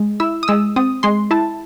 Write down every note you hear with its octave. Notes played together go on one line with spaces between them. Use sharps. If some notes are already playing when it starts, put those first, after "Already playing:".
Already playing: G#3
E4 E6
D#6
G#3 E6
C4 D#6
G#3 C6
E4 A5